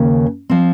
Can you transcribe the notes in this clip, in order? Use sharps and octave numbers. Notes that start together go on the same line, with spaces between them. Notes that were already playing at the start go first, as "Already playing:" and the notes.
Already playing: D#2 C#3 A#3 C#4
F3 C4